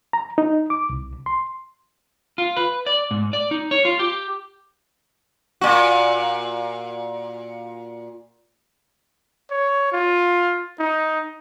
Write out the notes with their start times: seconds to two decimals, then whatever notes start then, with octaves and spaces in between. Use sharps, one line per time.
0.13 A#5
0.38 D#4
0.70 D6
0.90 C2
1.26 C6
2.38 F4
2.56 B4
2.86 D5
3.11 G#2
3.33 D5
3.51 D#4
3.71 C#5
3.85 F4
3.99 G4
5.61 A#2 F#4
9.51 C#5
9.93 F4
10.80 D#4